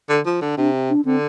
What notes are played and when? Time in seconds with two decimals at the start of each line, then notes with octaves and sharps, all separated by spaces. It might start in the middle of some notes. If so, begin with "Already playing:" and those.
0.09 D3
0.26 F3
0.42 D3
0.57 C3 D4
0.90 D4
1.05 D3 C4